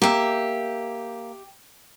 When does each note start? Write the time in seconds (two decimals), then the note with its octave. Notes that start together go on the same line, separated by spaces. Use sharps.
0.02 A#3 G4 E5